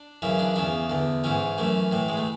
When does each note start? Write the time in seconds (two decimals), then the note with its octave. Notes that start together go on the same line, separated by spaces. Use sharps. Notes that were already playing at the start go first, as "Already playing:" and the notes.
Already playing: D4
0.22 F#2 C#3 E3 E4
0.39 D4
0.56 E2 C#3 E3 E4
0.90 E2 D3
1.24 G#2 E3 C#4
1.58 F#2 E3 A3
1.92 A2 E3
2.08 G#3
2.17 A3